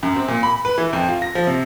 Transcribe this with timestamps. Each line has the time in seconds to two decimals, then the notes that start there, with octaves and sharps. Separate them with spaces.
0.03 F#2
0.16 C4
0.28 A#2
0.43 B5
0.65 B4
0.78 E3
0.93 F2
1.09 F4
1.22 A#6
1.35 F3
1.47 C3